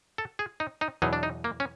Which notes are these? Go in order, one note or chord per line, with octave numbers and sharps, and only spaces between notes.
A4
G#4
D#4
D#4
E2 B2 F#3 D#4
D4
D#4
A#3
C#4